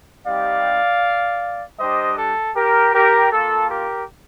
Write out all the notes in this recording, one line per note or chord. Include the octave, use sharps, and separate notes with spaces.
G3 C4 D#4 G4 D5 F5
G3 D4 G4 C5 D#5
A4
G4 A#4
G4 A#4
A#3 F4 A4
G4 A#4